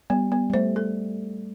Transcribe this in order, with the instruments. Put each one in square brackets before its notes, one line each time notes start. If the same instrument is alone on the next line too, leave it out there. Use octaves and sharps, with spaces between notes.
[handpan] G3 [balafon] B3
[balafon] B3
[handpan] G3
[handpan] A3 [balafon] C5
[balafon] A4